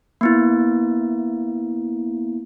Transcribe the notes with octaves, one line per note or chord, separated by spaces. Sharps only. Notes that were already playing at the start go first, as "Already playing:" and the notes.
A#3 B3 E4